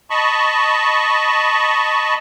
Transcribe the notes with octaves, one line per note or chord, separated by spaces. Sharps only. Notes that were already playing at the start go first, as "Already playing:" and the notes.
D#5 A5 B5 C#6